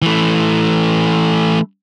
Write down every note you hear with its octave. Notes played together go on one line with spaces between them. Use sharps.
E3 A3